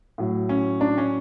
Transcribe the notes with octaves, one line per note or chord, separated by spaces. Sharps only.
A2 F#3
C#4
D4
C#4